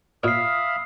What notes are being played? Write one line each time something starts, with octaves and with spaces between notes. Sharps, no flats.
A#2 C#5 E5 F5 B5 D#6 F6 C7